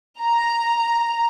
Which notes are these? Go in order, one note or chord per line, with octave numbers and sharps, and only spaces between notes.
A#5